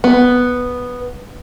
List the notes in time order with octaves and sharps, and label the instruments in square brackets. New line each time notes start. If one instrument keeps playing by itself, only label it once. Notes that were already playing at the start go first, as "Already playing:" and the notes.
[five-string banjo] B3